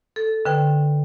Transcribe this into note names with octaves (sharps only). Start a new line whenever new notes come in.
A4
D3 B4 G5